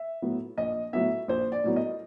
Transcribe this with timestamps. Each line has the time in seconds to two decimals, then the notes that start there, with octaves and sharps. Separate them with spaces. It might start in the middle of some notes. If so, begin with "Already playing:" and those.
Already playing: E5
0.22 A2 F#3 B3
0.58 A#1 D#5
0.93 A2 F#3 B3 E5
1.28 A#1 C5
1.52 D5
1.64 A2 F#3 B3
1.76 D#5